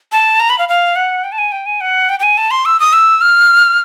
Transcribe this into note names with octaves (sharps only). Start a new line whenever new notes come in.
A5
A#5
B5
F5
F5
F#5
G5
A5
G#5
G5
G#5
F#5
G5
G5
G#5
A5
C6
E6
D#6
E6
F6